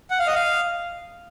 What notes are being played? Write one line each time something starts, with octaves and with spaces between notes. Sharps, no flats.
F#5
F5
D#5
F5